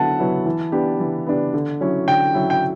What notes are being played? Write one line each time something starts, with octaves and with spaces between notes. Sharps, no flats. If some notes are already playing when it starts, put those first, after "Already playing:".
Already playing: D3 F#3 B3 E4 F#5 A5
F#3 B3 E4
E3
B3 D4 G4
E3
B3 D4 G4
D3
F#3 C#4 E4
D3 G5
F#3 C#4 E4
G5